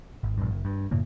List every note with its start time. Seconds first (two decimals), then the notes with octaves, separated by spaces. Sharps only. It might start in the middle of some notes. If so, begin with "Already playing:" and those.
0.23 G#1
0.38 A#1 G2
0.50 F#1
0.65 G2
0.91 F#2 A2 C#3 A#3